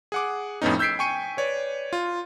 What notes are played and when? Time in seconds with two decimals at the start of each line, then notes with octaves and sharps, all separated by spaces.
0.12 G#4 F#5 D6
0.62 F2 A2 B3 C#4 D#4
0.79 E6 G6 G#6 B6 C7 D7
0.99 G5 G#5 C#6 C#7 D#7
1.37 B4 C#5 D5
1.93 F4